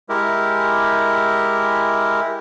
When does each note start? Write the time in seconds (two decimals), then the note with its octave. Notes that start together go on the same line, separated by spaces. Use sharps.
0.09 G#3 E4 G4 A#4